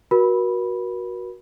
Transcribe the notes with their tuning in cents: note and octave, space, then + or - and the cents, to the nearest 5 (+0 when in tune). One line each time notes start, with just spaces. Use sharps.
F#4 +0 A#4 +40 B5 -5